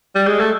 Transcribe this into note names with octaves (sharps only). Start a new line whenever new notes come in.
G3
G#3
A3